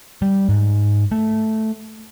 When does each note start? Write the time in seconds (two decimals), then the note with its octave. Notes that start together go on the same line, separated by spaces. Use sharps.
0.22 G3
0.49 G#2
1.11 A3